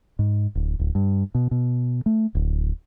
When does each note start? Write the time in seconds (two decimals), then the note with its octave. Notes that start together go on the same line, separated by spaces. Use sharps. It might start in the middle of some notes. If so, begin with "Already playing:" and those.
0.19 G#2
0.55 D1
0.79 D1
0.95 G2
1.35 B2
1.51 B2
2.06 A3
2.35 D1